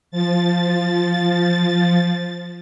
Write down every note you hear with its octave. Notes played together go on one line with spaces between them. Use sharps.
F3 A6